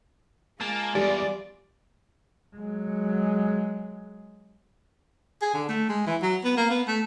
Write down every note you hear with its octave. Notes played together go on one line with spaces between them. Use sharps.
G#3 A#3 F4 G#4 A5
E2 G3 D5
F#3 G#3
G#4
D3
A3
G#3
E3
F#3
B3
A#3
B3
A3